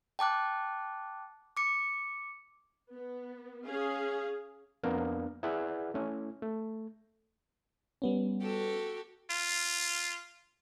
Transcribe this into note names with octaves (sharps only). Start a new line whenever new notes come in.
G5 A5 D6 F#6
D6 C#7
B3
C#4 G#4 F5
F2 A#3 B3 D4 A#4 F5
E4 G#4 B4 D5 E5 F#5
A3 C#4 E4
A3
G3 B3 C#4
F#4 G4 A4
F4